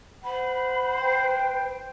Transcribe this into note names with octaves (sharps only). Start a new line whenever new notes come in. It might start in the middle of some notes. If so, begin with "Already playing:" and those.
C5 F#5 B5
B4 G5